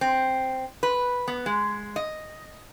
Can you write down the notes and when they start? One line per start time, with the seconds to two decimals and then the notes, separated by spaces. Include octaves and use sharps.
0.01 C4
0.83 B4
1.28 B3
1.46 G#3
1.96 D#5